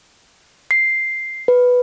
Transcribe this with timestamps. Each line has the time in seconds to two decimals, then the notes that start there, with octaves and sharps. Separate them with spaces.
0.71 C7
1.48 B4